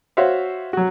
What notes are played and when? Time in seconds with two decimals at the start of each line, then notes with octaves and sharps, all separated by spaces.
0.17 F#4 C5 C#5 E5 F5
0.73 F#3 F#4